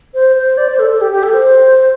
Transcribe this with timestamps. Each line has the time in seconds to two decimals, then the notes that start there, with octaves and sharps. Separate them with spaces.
0.15 C5
0.36 C5
0.58 D5
0.68 C5
0.79 A4
0.90 A4
1.01 G4
1.12 G4
1.23 A4
1.34 C5